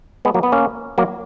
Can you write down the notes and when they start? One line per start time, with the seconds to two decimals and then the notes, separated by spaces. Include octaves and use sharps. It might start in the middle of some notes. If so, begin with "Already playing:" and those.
0.25 G#3 B3
0.34 F#3 A#3
0.43 B3
0.52 A#3 C#4
0.98 F#3 A#3